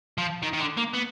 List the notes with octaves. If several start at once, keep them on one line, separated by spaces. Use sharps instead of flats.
F3
D#3
D#3
D3
A#3
B3